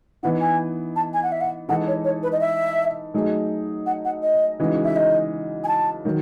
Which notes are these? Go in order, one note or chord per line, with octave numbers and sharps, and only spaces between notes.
E3 B3 D#4 F#5
G#5
A5
G#5
F#5
E5
F#5
E3 G#3 D#4 A4 F#5
C#5
C#5
B4
D#5
E5
F#3 A3 D#4 G#4
F#5
F#5
D#5
C#3 E3 G#3 D#4 F#4
E5
D#5
G#5
A5
D#3 F#3